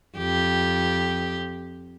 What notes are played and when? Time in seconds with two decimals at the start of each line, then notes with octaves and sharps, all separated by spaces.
0.18 F2 G4